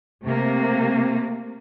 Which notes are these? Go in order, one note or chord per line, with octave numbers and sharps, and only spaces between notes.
C3 A3 A#3